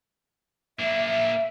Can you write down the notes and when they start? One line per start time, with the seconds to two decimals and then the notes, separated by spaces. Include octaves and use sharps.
0.79 A#3 D4 E5
1.05 E5